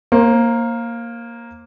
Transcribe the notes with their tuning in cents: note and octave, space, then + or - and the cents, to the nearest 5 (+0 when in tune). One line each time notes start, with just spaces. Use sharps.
A#3 +0 C5 +35